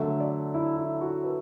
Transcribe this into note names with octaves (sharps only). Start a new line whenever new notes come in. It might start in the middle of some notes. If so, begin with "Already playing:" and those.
Already playing: D3 F#3 A3 E5
D5
E4
E4
F#4
B4